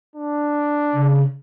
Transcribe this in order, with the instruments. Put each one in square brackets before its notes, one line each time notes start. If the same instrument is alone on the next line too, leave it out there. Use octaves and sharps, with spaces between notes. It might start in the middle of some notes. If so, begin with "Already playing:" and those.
[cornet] D4
[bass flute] C#3